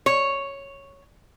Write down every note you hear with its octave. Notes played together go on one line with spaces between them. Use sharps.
C#5